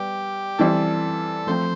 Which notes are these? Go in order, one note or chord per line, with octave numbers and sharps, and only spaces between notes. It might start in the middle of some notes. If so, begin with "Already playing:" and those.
Already playing: G3 B3 G4
E3 G3 C4 E4 A4
F3 A3 C4 C5